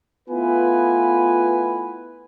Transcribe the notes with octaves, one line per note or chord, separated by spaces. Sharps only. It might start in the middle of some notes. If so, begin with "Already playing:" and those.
A3 B3 E4 F4 B4 G#5